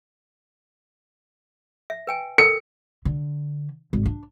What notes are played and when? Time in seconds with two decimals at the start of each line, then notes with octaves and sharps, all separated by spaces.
1.90 E5
2.07 B4 G5 G#5
2.38 A4 A#4 C#7
3.05 D3
3.93 G#1
4.06 D4